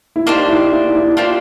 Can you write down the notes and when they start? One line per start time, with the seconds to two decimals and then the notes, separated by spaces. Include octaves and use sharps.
0.16 E4
0.26 A#3 D4 D#4 G4 C5
0.44 D#4
0.49 E4
0.72 E4
0.95 E4
1.17 A#3 D4 F4 G4 C5